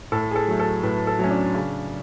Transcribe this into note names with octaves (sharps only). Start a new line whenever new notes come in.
A2 A4
G#4
A4
F#3 A3
A4
A2 B4
A4
F#3 A3 C#4
D4
C#3